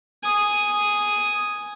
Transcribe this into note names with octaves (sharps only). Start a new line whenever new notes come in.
G#5 D#6